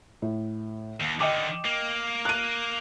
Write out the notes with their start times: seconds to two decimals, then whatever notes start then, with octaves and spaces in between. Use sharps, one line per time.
0.22 A2
1.01 D#2
1.20 D3 D#3 D#5 G5 D6
1.65 A#3
2.25 F#6 D#7